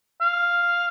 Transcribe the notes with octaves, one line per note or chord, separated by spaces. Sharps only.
F5